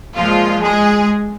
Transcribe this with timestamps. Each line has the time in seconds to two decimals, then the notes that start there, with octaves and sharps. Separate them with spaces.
0.16 A#2 F3 G#3 F4
0.63 G#3 G#4